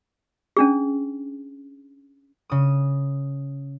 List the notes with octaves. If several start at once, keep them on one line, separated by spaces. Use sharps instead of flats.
C#4 D4 G#4
C#3 D#6